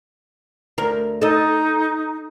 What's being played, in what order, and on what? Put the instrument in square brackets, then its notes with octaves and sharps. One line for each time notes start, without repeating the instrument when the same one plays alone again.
[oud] D2 A#4
[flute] D#4 [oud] A4 D#5